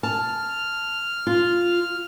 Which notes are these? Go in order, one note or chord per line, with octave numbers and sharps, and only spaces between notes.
A5 F6
F4